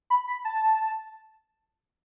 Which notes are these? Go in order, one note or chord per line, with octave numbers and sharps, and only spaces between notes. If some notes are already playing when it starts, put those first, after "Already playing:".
B5
B5
A5